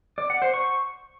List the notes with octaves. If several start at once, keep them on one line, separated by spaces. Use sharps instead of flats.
D5
F#5
C5
C#6